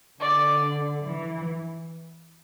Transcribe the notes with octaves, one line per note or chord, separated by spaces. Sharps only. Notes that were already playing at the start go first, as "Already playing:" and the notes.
D3 D5
E3